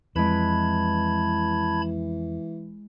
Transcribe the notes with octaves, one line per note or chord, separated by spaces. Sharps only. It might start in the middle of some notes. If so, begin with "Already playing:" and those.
F2 E3 G#3 E4 B4 A5 B5 G#6